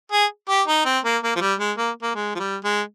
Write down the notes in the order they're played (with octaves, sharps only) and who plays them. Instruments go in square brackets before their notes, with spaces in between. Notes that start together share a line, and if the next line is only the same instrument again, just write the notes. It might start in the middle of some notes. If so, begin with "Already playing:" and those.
[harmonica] G#4
G4
D#4
C4
A#3
A#3
F3
G3
G#3
A#3
A#3
G#3
F3
G3
G#3